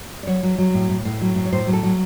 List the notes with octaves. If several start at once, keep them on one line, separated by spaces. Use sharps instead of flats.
D5
F#3 C#5
F#3
F#3
A2
A2
A2
F#3
A2
C#5
A2 C5
F#3
A4
F#3